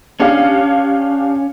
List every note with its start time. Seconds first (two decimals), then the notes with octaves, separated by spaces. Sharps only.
0.20 C#4 D4 G4 F5